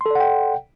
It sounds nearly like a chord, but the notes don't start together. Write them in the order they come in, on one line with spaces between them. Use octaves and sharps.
C6 A4 D5 F#5 G5